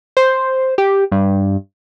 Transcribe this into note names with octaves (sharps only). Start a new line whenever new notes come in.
C5
G4
G2